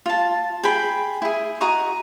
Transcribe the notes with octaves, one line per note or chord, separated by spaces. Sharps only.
F4 A5
G#4 G5 B5
E4 G#4
F#4 D#5 A#5 C#6